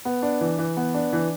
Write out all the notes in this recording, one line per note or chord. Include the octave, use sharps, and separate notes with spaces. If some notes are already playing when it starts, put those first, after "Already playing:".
B3
D4
E3
E3
B3
D4
E3